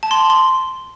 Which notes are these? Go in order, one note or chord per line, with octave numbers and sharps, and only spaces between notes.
A5
C6
C6